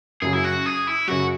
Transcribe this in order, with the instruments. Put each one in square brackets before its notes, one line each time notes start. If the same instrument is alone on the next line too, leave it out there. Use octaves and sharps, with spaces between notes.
[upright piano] F#2 C#3 F#3 [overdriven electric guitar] G#4
[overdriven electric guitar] E4
F#4
G#4
E4
[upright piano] F#2 C#3 F#3 [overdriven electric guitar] F#4